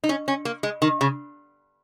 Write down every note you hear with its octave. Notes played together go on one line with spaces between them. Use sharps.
D#4
C#4
C#4
A#3
G#3
D#3
C#3